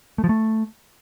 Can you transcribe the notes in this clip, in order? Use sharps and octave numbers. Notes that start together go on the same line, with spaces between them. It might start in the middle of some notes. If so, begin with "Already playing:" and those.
A3
F3
A3